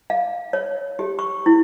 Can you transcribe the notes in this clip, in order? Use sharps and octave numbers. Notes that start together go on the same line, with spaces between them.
F5
C#5
G4
C#6
E4